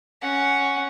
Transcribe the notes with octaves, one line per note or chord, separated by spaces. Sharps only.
C#4 F#5